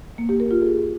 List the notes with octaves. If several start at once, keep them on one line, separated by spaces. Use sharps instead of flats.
A#3
G4
A#4
F4
G#4